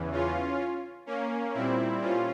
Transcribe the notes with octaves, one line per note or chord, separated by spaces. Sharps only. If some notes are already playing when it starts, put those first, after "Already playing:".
Already playing: E2 C#3 E3
C#4 F4
A#3 C#4
A#2 G3 C4 E4
C#4 F4